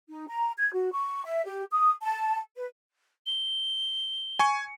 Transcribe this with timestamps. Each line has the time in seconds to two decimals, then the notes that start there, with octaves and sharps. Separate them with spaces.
0.09 D#4
0.28 A#5
0.58 G#6
0.73 F#4
0.93 C#6
1.25 E5
1.45 G4
1.71 D#6
2.02 A5
2.56 B4
3.26 G7
4.39 G#5 C#6 C#7